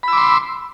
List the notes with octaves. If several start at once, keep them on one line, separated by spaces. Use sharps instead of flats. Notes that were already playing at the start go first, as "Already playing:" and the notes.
B5 C6 D6 E6